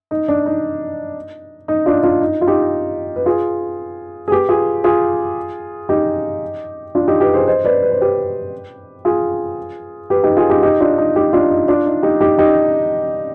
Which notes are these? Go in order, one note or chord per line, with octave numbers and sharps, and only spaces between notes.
D#4
D4
D#4
D#4
D4 F4
D4 F4
D#4
F4
D#4 G4
B4
F4 G#4
G#4
G4 B4
F4 G#4
F4 G#4
D#4 G4
D4 F4
D#4 G4
G4 B4
G#4 C5
C5 D#5
B4 D5
B4
C5
G4 B4
F4 G#4
G4 B4
D#4 G4
F4 G#4
D#4 G4
D#4 G4
D4 F4
D#4
D#4 G4
D4 F4
D#4
D4 F4
D#4
D#4 G4
D#4 G4
D#4 G4